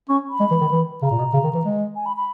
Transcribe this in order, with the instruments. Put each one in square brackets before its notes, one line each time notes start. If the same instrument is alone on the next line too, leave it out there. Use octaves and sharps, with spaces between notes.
[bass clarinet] C#4 [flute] C#6
[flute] B5
[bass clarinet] G#3
E3
D#3
E3
[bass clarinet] C#3 [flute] A#5
[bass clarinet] A#2
B2
C#3
D#3
E3
G#3
[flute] G#5
B5
B5